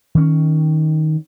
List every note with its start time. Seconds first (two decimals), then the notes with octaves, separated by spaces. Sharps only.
0.15 D#3 C#4